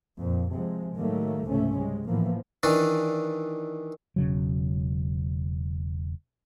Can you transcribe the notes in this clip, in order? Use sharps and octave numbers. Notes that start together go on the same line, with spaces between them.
F2 A#2
C3 F3 G#3
A2 D#3 F#3 G3 A3 A#3
C#2 G#2 C3 F3 A3 C#4
G3 G#3
A2 E3 F3 A#3 B3
D#3 E3 D4
E1 C#3 F#3